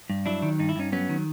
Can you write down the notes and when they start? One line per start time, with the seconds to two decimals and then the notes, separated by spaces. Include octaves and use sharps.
0.10 G2
0.26 F#3 D4 E4
0.42 D#3
0.59 G2 D#4
0.69 E4
0.76 G2 C#4 D#4
0.92 F#3 B3 C#4
1.09 D#3